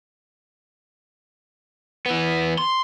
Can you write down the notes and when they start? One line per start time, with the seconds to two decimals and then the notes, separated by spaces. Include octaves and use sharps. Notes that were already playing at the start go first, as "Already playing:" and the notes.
2.06 E3 B3
2.58 C6